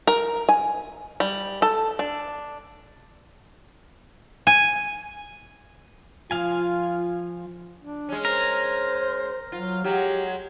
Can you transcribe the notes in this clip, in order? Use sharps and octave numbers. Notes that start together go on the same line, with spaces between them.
A#4
G#5
G3
A4
D4
G#5
F3 F4 F5 G#5
D4
G#3 C#4
A#4 C5
F#3 F4
F#3 G#3 G4